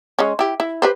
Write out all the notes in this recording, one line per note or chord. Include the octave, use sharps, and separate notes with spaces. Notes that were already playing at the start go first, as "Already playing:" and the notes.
G#3 C#4
E4 G4
E4
G4 B4 C5